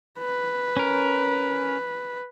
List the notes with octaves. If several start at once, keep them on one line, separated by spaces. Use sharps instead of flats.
B4
C#4 A#4